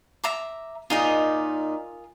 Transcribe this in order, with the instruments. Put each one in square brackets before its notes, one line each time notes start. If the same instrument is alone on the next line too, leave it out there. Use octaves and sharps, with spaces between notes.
[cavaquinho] E5 A#5 D6
[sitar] A#2 D#4 [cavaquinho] F4 G#4 A#4